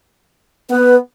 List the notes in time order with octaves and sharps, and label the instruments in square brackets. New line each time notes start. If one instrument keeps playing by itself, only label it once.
[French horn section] B3 [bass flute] B4